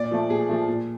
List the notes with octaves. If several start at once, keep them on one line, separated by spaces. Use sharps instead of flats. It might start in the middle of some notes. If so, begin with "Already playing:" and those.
Already playing: A#2 D5
F3 A3
A#2 G#4
F3 A3
A#2